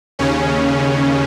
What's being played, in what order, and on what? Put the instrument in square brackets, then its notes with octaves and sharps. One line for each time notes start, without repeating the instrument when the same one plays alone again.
[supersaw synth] D#2 C#3 C#4